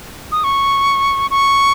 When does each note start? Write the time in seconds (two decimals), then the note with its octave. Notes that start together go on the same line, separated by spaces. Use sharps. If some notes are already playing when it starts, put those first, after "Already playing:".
0.32 D#6
0.44 C#6
1.30 C#6